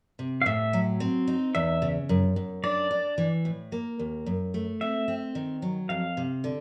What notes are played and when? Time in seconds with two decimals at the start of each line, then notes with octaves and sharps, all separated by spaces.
0.19 C3
0.42 F5
0.46 A2 E5
0.73 F#3
1.00 C4
1.27 D#4
1.55 E2 E5
1.82 C#3
2.09 F#2
2.36 F#2
2.63 D4 D5
2.91 D4
3.18 E3
3.45 A2
3.72 A#3
3.99 D#2
4.26 F#2
4.54 A3
4.81 C4 E5
5.08 C4
5.35 D#3
5.62 F#3
5.89 F2 F5
6.17 C3
6.44 D3